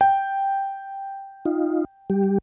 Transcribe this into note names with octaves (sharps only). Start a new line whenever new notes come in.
G5
D#4 F4
G3 G4